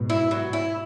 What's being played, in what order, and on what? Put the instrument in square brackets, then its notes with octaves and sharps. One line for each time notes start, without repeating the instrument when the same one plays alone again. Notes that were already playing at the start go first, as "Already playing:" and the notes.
Already playing: [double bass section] G#2 B2
[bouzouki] E4
F#3
E4